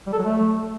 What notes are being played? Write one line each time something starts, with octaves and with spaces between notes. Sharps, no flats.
G3
A4
F#3
A3